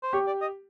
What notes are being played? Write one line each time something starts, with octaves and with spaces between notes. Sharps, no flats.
C5
G4 C#5
D5
D#5